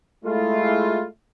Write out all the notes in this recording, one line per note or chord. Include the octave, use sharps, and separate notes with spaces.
G#3 A3 E4 F4